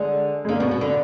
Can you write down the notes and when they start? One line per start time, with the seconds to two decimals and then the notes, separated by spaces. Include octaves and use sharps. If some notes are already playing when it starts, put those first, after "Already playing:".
Already playing: D3 G#3
0.45 G#3
0.49 D3 A#3
0.60 B2 B3
0.71 B2
0.81 D3